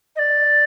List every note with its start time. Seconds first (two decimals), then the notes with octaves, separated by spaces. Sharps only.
0.15 D#5
0.18 D5